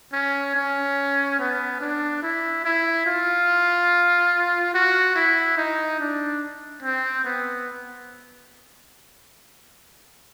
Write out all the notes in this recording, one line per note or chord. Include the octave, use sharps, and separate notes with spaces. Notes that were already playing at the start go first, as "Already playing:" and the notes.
C#4
C#4
B3
D4
E4
E4
F4
F#4
E4
D#4
D4
C4
B3